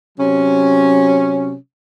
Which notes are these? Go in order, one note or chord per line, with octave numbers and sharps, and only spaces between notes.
C3 F#3 C#4